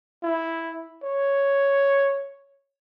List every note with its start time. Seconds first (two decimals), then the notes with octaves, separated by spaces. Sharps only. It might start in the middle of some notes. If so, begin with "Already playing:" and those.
0.23 E4
1.03 C#5